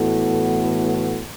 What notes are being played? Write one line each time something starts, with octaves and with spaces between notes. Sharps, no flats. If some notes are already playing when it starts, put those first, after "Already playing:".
Already playing: A2 E3 B3 F#4 A4